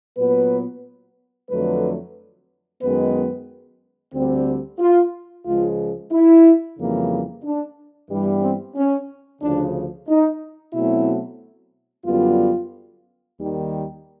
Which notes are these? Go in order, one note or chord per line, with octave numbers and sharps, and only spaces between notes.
A#2 F#3 B3 B4
F2 D3 F#3 A3 B4
F#2 D#3 G#3 B3 B4
D2 D3 G3 C4
F4
C#2 C#3 F3 G#3 F4
E4
F2 C#3 E3 G3 A#3
D4
G2 E3 G3 B3
C4
C#4
D2 C#3 F3 D4
D#4
B2 F#3 A3 C4 E4
F#2 D3 G3 B3 F4
D#2 D#3 G3